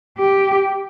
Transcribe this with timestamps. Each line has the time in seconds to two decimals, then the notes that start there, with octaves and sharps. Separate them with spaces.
0.18 G4